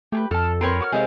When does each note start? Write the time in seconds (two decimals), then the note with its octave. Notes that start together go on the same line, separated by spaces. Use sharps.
0.12 A3 G4 G#4 B4
0.31 F2 A4 A5 F6
0.61 C4 A#4 B4 C#5 C6 C#6
0.81 F#4 D6 F6
0.92 C3 G#3 D#4 E4 G#4 F5